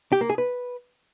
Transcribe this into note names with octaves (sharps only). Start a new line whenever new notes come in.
G4
A#3
G#4
B4